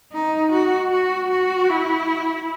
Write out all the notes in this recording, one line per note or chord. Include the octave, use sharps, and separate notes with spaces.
D#4
F#4
F#4
F#4
E4